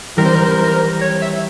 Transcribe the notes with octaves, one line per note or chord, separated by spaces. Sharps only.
E3 G3 C4 A#4
C5
A#4
C5
A#4
C5
A#4
C#5
E5